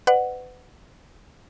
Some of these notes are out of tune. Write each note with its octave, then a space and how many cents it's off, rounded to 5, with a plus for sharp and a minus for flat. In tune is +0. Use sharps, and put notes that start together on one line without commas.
B4 +30 D5 +35 F#5 +0